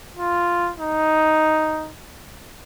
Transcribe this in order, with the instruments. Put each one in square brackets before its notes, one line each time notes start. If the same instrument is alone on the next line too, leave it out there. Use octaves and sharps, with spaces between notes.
[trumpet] F4
D#4